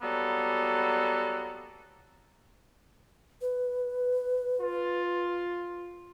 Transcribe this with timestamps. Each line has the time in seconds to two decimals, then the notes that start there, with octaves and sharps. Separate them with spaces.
0.02 F#3 G3 A#3 B3 A4
3.41 B4
4.61 F4